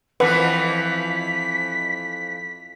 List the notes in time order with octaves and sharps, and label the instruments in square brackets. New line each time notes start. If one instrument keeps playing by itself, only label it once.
[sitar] F2 E3 F3 [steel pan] B4 F#5 [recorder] B6